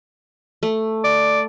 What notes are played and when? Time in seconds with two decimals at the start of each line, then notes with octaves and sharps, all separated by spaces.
0.63 A3
1.04 D5